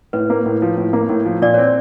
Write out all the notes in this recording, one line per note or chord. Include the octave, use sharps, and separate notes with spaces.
A2 B4
A#3
A2
F3
A2
A#3
A2
F3
A#2 D5
C4 C#5